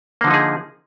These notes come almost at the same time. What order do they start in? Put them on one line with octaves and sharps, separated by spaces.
A#3 D3 F3 D#4 G#4